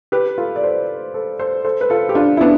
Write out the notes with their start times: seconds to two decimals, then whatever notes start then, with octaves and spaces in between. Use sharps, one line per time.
0.12 G4 B4
0.38 F4 A4
0.56 D5
0.63 A4 C5
1.14 A4 C5
1.39 A4 C5
1.65 A4 C5
1.81 B4
1.90 F4 A4
2.09 G4
2.15 D4 F4
2.37 E4
2.41 B3 D4